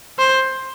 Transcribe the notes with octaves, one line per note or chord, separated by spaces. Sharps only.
C5